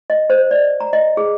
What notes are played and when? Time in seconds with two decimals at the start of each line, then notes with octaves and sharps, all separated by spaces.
0.10 D#5
0.30 C5
0.51 D5
0.80 A#5
0.93 D#5
1.17 G#4